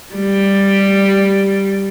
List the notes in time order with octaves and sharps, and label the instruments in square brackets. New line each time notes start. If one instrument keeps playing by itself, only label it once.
[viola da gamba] G3